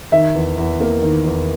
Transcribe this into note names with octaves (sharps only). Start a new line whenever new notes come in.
D#3 E5
E2
E2
A#3
D#3
E2